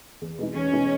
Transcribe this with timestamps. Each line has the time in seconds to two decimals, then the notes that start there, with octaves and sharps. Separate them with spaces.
0.21 E2
0.38 B2 G#3 D#4
0.56 E2 C#4
0.73 B2 G#3 D#4